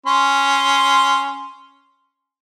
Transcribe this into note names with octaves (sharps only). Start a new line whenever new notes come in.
C#4 C6